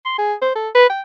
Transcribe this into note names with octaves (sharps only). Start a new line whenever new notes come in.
C6
G#4
C5
A4
B4
G5